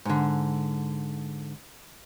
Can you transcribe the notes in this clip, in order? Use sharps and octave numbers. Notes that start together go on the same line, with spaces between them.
G#2 D3